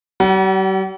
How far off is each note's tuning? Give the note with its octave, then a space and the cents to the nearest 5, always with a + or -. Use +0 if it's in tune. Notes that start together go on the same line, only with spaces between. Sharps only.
G3 -45 F#5 +30